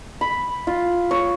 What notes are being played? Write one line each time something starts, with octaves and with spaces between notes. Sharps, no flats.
B5
F4
C#5